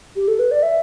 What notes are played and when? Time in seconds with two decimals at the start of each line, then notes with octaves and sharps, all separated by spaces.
0.16 G4
0.28 A4
0.39 B4
0.51 D5
0.63 E5